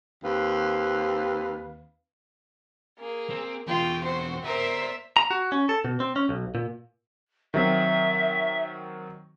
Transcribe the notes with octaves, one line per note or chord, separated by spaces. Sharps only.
D#2 C4 B4 F5
A#3 G#4
C4
E2 B2 F4 G5
C4 F#4 C5
A#4 C5 D5 E5 A#5
A#5
F#4
C#4
A4
B2
C4
C#4
B1
A#2
D#3 F#3 C4 E5